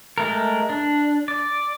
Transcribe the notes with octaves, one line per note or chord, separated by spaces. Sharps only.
G#3 A3 A#4
D4
D5